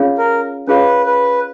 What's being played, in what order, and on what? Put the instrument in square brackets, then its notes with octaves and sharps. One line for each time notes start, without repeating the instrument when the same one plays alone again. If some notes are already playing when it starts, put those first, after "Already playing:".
Already playing: [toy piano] C#4 F4 G#4 C#5 F5
[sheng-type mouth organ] A#4
[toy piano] C#4 F4 G#4 C#5 F5 [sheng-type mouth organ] B4
[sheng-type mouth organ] B4